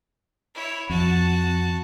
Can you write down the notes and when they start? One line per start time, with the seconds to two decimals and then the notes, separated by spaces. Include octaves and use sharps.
0.55 E4 C#5
0.90 F2 F#4 A5